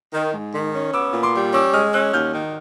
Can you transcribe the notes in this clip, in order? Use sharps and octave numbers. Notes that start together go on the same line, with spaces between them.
D#3
G#2
D#3
C#4
B3 D6 E6
A#2
C6 D6
G3
C#4 D6 E6
G#3 D#6 F6
C#4 E6 F#6
D#2 F6 G6
D#3